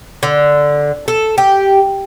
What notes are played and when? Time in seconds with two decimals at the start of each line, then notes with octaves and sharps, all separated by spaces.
0.23 D3
1.08 A4
1.38 G4